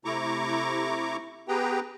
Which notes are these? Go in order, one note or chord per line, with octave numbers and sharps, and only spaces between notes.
C3 A3 E4 A#5 C#6 D6
B3 G4 G#4 B4 G5 A#5